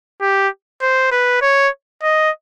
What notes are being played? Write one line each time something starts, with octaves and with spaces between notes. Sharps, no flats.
G4
C5
B4
C#5
D#5